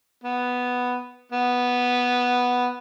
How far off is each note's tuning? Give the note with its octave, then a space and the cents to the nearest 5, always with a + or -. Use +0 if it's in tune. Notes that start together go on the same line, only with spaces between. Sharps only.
B3 +0
B3 -5